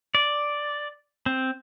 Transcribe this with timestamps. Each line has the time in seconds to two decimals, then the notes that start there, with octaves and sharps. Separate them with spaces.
0.15 D5
1.26 C4